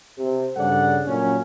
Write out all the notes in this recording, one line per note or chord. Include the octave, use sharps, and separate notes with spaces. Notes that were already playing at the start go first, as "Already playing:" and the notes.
C3
G2 C#3 A4 D5 F#5
A#2 F#3 A#3 C#4